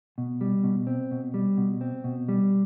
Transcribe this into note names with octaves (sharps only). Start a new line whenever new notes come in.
B2
G3
B2
C4
B2
G3
B2
C4
B2
G3